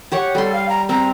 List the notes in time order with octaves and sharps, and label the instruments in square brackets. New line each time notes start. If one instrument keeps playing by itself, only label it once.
[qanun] G4 C#5 F#5
[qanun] G3 C6 [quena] A4
[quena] F5
A#5
[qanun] C4 [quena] A#5